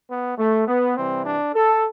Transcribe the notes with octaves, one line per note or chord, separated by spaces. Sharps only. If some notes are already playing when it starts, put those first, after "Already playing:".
B3
A3
B3
C3 E3 G3 C4
D4
A4